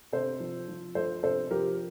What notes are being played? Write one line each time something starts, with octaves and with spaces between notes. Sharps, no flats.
C3 A4 C5
F3
F3
F3 A4 C5
C3 A4 C5
F3 G4 A#4